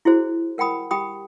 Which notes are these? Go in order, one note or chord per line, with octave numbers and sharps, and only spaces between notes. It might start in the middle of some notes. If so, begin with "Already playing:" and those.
E4 F#4 G#4 C5
A#4 F#5 G5 B5 D#6
G4 G5 B5 D#6